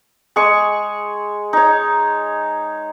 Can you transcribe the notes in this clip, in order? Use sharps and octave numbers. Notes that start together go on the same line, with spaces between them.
G#3 G#4 C#6
D#4 C#5